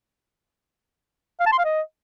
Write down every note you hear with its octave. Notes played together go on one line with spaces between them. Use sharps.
F5
A5
C6
F5
D#5